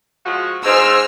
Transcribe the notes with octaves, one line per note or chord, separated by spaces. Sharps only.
F3 G#3 F#4
G#2 C5 G#5 E6 F6